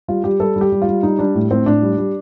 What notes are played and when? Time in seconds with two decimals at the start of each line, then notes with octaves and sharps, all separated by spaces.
0.08 G3 F4
0.24 G3 G4
0.40 G3 A4
0.56 G3
0.61 G4
0.72 G3
0.82 F4
0.88 G3
1.03 G3 D#4
1.19 G3 D4
1.35 A2
1.51 A2 C4
1.66 A2 D4
1.82 G3
1.98 G3